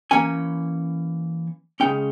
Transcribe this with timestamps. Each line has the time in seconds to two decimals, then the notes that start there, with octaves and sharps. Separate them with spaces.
0.11 E3 A#3 C#4 G#5
1.80 C#3 G#3 C#4 G5